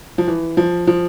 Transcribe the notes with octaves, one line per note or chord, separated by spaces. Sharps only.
F3
E3
F3
F3